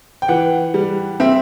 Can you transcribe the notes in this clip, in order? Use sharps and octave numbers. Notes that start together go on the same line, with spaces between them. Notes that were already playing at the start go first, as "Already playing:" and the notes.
G5
E3 F#5
G3
C4 E5